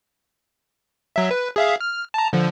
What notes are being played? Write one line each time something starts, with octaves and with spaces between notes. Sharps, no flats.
F#3 E5
B4
G#4 E5 F5
F6
A5 A#5
D3 F3